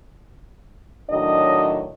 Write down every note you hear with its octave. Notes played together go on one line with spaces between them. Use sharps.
A2 D#3 F#3 D4 D#5